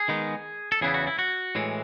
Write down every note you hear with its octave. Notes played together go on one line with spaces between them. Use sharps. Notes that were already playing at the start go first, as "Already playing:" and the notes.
Already playing: G#4
D#3 G#3 B3 D#4
A4
E2 C#3 E3 B3 E4 G#4
F#4
E4
F#4
A2 E3 G#3